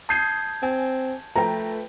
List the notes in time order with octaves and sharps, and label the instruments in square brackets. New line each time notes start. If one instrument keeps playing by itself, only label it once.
[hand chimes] A5 G6 G#6 [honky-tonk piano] D#6 C7 D#7
[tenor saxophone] C4 [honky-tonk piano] G#5
[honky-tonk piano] F3 B4 G5 [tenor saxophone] A3 [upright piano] A#5